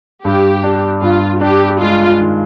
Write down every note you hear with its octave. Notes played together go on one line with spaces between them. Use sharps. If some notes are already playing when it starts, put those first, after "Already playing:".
G2 G4
D4
G2 F4
D4 G4
G#3 F4
D#3